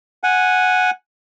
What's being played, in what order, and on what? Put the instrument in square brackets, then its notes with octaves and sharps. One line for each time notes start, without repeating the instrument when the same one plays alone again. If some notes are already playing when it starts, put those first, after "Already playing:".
[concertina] F#5 G#5